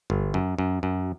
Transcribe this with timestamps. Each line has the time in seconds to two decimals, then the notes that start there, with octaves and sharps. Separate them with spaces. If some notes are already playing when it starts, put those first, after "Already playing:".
0.10 G1
0.34 F#2
0.58 F#2
0.83 F#2